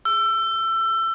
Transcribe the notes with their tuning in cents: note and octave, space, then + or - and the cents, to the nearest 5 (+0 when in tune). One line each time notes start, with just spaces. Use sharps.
E6 +25